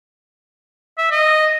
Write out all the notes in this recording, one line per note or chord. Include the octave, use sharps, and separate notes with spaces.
E5
D#5